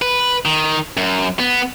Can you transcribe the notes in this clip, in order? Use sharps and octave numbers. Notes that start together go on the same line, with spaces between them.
B4
D#3
F#2
B3